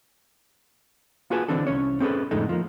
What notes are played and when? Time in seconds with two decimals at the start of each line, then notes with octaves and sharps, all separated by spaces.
1.30 A#3 F4 F#4 G#4 B4 A5
1.48 D3 E3 C4 D4 A4
1.67 C2 C#4 C#5
2.00 C4 C#4 G#4 A4 B4
2.31 F2 A2 D3 G#3 A3 D#4
2.49 F3 A#3